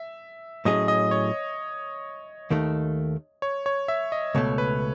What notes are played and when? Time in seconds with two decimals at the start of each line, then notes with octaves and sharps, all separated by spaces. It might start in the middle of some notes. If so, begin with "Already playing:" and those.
Already playing: E5
0.65 A2 F#3 C#4 G#4 D#5
0.88 D#5
1.11 C#5
2.50 D#2 D#3 A3
3.42 C#5
3.66 C#5
3.88 E5
4.12 D#5
4.35 C#2 B2 A3 C#5
4.58 B4